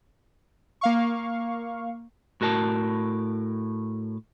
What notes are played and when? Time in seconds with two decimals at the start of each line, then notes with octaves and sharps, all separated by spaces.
0.81 A#3 F5 C#6
2.41 A2 F#4 A#4 A5